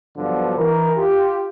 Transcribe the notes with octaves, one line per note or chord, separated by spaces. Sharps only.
G2 D3 F3 F#3 B3 D4
E3 A#4
F4 G4